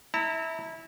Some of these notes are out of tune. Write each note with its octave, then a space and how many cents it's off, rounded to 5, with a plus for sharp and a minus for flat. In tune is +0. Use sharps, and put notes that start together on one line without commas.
E4 -20 A#5 -40